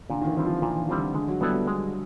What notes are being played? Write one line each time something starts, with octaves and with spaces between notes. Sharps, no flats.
A#2 D3
D#3
E3
G3 C4 F4
F3
A#2 E3
D#3
G3 C4 F4
D3
D3 G#3
F#3
G3 B3 E4 A4 D5
G3
G#3